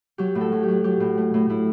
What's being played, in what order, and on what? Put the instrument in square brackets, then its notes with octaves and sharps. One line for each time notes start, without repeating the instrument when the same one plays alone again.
[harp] F#3 G4
A2
A4
F#3
G4
F#3
F#3 G4
A2
A3
A2
A2 E4